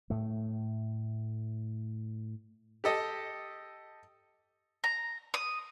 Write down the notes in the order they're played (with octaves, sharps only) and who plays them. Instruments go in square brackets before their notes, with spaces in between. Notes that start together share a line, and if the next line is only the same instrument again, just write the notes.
[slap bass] A2 A3
[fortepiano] G4 A4 D#5
[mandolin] A#5
D#6